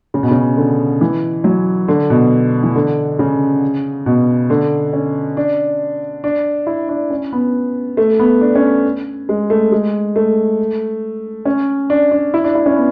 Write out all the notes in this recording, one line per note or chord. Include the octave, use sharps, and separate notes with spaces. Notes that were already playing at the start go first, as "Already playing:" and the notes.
C#3
B2
C#3
D3
E3
F#3
D3
B2
E3
D3
C#3
B2
D3
C#4
D4
D4
E4
D4
C#4
B3
A3
B3
D4
C#4
G#3
A3
G#3
A3
C#4
D4
D4
E4
D4
E4
C#4
B3